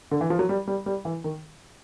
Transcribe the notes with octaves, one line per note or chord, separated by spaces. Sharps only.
D3
E3
F3
F#3
G3
G3
G3
E3
D#3